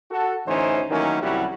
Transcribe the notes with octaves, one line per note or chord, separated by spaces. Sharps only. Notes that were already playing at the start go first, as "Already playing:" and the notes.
F#4 A4
A1 D2 E3 C#4 D#4 C5
D#3 E3 F#3 A3 A#3 C#4
C2 F#3 G3 C#4 E4 F#4